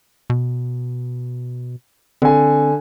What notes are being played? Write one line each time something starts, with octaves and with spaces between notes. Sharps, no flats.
B2
D3 C4 G#5